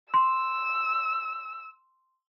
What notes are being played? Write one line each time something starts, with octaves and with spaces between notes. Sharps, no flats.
C6 E6